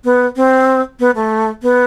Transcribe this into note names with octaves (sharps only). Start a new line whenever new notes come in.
B3
C4
B3
A3
B3